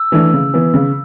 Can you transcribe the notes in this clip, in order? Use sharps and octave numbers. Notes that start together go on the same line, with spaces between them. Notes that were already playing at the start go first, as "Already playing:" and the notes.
Already playing: E6
E3 A3 D4
C#3
E3 B3
C#3